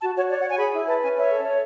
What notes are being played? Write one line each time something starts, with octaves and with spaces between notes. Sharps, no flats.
F#4 A5
F#4 C#5
C#5 D5
F#5
C#5 G#5
G#4 B5
E4
B4 A5
C#4 G#5
C#5 E5
A4
C#5